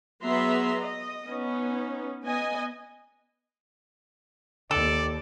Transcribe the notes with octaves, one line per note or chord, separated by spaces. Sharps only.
F#3 B3 G#4 E5 A#5 C6
D#5
B3 C#4 D#4
B3 D#5 G#5
D#2 A4 D5